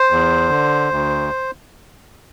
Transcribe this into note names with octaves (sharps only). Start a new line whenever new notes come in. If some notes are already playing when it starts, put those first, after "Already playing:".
Already playing: C5
E2
D3
D2